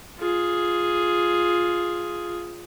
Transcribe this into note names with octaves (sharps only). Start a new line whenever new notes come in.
F4 G#4